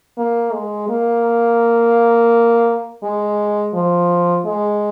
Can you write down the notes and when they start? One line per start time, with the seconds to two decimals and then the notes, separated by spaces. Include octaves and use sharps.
0.18 A#3
0.53 G#3
0.89 A#3
3.03 G#3
3.74 F3
4.46 G#3